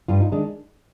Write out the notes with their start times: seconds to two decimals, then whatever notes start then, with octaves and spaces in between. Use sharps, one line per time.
0.08 G2 F4
0.21 D#4
0.32 D#3 G#3 D4